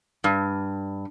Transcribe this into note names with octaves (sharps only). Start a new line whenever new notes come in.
G2